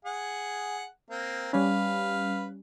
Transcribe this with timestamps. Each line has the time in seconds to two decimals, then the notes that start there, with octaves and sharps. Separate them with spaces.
0.05 G#4 F#5
1.10 A#3 C4
1.53 G3 C#4 B4 F5